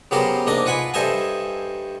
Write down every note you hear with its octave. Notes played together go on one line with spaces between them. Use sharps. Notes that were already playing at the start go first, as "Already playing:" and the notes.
C#3 F#3 B3 G4 A#4 C5
G#2 A#3 D4 D#5 D#6
F4 B4 F#5 G#5 B5
G2 A4 C5 D#5 E5 G#5